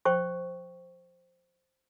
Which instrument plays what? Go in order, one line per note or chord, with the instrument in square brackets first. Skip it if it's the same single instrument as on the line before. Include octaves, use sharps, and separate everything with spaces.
[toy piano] C5 G5 C#6